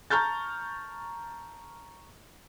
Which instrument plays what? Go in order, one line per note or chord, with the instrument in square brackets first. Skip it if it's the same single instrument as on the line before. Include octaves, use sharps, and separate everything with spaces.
[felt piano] A5 A#5 C#6 F6 G6 A6